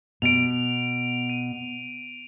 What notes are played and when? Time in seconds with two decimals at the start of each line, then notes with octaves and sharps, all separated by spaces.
0.22 B2 D7 F7
1.30 D#7